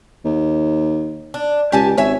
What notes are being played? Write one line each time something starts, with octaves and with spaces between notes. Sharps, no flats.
D#2
D4
C#2 G4 G#5 A5
G#1 C#5 E5 G#5